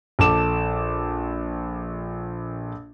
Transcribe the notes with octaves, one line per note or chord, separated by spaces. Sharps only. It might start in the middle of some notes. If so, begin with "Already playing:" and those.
A#1 A4 A5 D6 E7